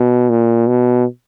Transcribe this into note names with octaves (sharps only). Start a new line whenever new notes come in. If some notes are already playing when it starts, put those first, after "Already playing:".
Already playing: B2
A#2
B2